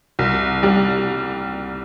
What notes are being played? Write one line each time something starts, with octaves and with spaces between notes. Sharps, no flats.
C2
G3